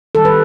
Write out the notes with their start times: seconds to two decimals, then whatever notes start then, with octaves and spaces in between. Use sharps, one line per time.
0.15 D#3 G3 A4
0.25 B4